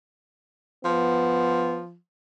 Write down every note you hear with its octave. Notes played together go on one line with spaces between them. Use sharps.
F3 B3